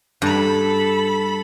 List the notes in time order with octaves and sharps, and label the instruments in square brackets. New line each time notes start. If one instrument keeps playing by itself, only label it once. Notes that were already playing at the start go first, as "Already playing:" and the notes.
[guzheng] G2 [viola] A4 B5